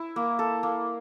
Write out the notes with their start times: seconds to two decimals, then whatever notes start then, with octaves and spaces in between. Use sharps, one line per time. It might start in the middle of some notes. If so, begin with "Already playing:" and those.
Already playing: E4
0.16 A#3
0.39 A4
0.63 A#3